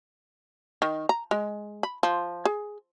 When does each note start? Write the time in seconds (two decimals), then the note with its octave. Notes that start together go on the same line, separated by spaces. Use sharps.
0.82 D#3
1.09 A#5
1.31 G#3
1.83 B5
2.03 F3
2.45 G#4